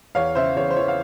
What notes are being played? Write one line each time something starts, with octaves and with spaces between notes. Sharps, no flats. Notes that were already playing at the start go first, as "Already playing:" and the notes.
E2 C#5 F5
C#3 C5 E5
E2 C#5
C5
E3 C#5
F5